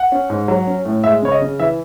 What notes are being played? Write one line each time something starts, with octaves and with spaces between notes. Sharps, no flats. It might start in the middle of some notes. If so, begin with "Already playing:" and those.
Already playing: F#5
C#4
G#2
F#3
C#4
A2
G#3 E5
C#3 C#5
D#5
C#3
E3 E5